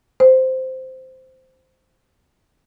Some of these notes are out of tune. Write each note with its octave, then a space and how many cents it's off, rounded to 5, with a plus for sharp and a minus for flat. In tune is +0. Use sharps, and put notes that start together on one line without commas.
C5 -10